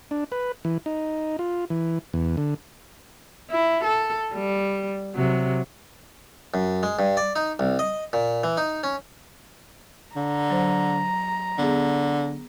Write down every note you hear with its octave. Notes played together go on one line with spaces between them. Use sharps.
D4
B4
E3
D#4
F4
E3
E2
D3
E4
A4
G3
C3 F#3
F#2
G#3
G2
D5
D#4
C2
D#5
A#2
E3
D#4
C#4
D3 A#5
F#3 C5
D3 B3 G#4